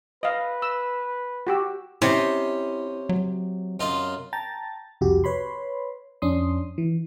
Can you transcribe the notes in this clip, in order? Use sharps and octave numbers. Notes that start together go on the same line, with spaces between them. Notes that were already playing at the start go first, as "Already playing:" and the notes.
B4 D#5 F5
E6
F#4 G4 E6
C3 C#4 E4 C5 D#5
F#3
F#2 F4 D#5
G5 A5 A#5 A6
C2 F2 C3 F#4 G4
B4 C#5 B5 C6
F2 C#4 D4 C6 D#6
E3